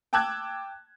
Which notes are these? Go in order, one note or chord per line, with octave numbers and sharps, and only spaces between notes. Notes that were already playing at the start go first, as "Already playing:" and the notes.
G5 A5 D6 E6 F#6 G#6